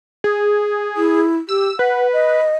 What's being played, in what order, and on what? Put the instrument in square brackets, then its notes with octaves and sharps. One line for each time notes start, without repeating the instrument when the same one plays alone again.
[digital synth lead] G#4
[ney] E4
[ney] G4 [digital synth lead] E6
[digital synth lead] B4 [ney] F#5
[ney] D#5